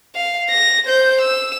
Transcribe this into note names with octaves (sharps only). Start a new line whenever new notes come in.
F5
A#6
C5 G6
E6